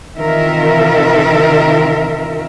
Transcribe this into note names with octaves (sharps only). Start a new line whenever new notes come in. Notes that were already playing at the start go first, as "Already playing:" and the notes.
C3 D#3 E3 F4 A#4 E5